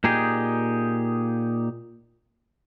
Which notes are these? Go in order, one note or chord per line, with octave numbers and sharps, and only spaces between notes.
A#2 D#4 G4 G#4